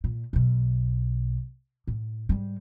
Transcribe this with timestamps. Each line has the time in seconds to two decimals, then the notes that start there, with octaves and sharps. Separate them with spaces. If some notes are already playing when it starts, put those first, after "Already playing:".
0.04 A#2
0.33 B1 B2
1.87 A2
2.29 G#2 G3